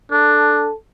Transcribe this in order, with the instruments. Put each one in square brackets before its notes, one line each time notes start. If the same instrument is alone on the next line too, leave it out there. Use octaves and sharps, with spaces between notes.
[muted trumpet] D4 [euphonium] A4